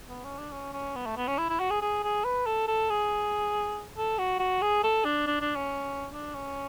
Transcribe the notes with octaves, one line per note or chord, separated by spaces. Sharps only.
B3
C#4
D4
C#4
C#4
B3
A3
B3
C#4
E4
E4
F#4
G#4
G#4
G#4
B4
A4
A4
G#4
A4
F#4
F#4
G#4
A4
D4
D4
D4
C#4
D4
C#4